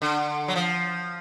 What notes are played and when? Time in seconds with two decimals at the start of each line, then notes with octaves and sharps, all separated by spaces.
0.02 D3
0.48 F#3
0.56 F3